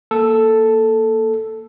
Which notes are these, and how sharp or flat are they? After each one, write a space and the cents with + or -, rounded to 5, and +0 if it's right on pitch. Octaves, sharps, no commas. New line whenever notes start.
A#3 +0 A4 +0